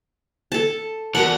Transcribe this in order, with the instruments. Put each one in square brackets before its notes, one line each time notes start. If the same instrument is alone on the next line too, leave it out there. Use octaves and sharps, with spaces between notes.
[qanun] A4 A5
[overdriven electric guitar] E2 [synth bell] F#4 A#4 A5 [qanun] F#5